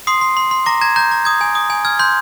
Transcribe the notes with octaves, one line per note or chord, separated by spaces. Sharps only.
C6 D#6 C7
C6
C6
C6
A#5 D6 A#6
A#5 G#6
A#5 G6
A#5
D#6 G#6
G#5
D#6
G#5
F6 G#6
C6 G6